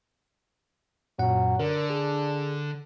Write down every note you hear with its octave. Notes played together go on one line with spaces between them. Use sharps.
F#2 A#2 F#3 F#5
D3 D4 A#4
G#4